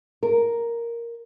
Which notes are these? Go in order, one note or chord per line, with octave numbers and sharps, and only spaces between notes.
A#4